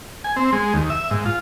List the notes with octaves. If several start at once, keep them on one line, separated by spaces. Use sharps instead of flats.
G#5
C4
G#3
D#2
E5
G#2
F4